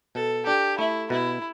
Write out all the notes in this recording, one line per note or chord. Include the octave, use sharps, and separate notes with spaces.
B2 A4
D4 G4
A3 E4
B2 E4